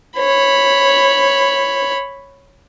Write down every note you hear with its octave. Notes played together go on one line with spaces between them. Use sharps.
C#5 B5